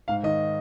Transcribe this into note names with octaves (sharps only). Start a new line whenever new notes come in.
G#2 F5
D#3 D#5